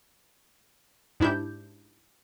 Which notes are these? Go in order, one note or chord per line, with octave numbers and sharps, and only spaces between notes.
G#2 D4 E4 G4 G6